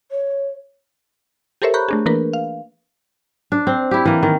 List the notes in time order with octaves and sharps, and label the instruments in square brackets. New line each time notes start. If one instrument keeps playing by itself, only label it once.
[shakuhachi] C#5
[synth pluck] G4 A4 A#4 C5 C#5 E5
A#5 B5 C#6 F#6 G6
A3 D4 G#4
E3 A#3 D4 A#4 B4
F5
[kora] D4
C4
E4 G4
E3 A#3
D#3